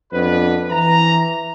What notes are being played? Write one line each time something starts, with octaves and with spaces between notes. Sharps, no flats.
F2 B3 D4 B4
E3 A#5